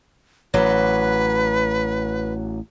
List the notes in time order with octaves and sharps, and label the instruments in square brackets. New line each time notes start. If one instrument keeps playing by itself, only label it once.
[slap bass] A1 [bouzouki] F#3 [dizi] B4